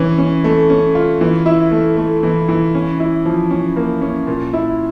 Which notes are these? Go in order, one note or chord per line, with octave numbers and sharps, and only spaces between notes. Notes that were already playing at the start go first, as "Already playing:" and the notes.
Already playing: E3 C#4
C#4
A3
C#4
F4
E3
E4
A3
A3
E3
E3
C#4
E4
F3
C#4
A#3
C#4
A#2
E4